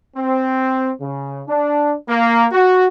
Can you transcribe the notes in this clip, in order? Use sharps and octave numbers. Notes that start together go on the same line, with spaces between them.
C4
C#3
D4
A#3
F#4